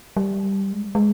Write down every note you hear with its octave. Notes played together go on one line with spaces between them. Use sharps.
G3
G#3
G#3